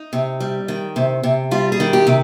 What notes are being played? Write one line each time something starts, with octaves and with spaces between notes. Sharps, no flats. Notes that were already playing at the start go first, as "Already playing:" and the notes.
Already playing: D#4
C3
G3
D#3
C3
C3
G3 F4
G#4
D#3
G4
C3